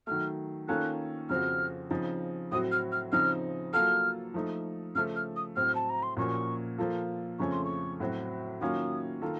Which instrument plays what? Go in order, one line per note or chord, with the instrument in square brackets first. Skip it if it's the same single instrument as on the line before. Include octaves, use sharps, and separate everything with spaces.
[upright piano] D#3 F#3 A3 [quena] F6
[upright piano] D#3 A#3 C#4 F4 A4 [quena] F#6
[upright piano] F2 C#3 F3 C4 F#4 [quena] F6
[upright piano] C#3 F3 C4 D#4
[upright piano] A2 F#3 C4 F#4 [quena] D#6
[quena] F6
F6
[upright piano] C#3 F3 C4 D#4 [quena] F6
[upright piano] F#3 A#3 F4 A4 [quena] F6
[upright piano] F3 A3 D#4
[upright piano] C#3 F3 A3 [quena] F6
[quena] F6
D#6
[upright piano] A2 F#3 C4 [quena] F6
[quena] A5
A#5
C6
[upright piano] A#2 F3 A#3 C#4 F#4 [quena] C#6
[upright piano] F3 A#3 F4 A4
[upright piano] F2 C#3 F3 A3 C#4 [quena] C#6
[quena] C6
C#6
[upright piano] A2 F#3 C4 F#4
[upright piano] D#3 F#3 A#3 C#4 F4 [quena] D#6
[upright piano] D#3 A#3 F4 A4